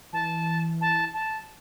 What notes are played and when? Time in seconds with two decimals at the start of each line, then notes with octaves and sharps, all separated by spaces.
0.13 E3 A5
0.81 A5
1.14 A5